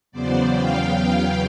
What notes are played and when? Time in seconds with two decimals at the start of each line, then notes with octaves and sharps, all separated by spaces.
0.11 E2 C#3 F#3 B3 C5 D5
0.53 F5 G5
0.95 F5 G5